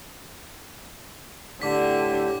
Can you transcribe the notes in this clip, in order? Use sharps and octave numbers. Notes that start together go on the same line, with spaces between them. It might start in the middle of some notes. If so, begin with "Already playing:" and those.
A2 D3 G4 D6 B6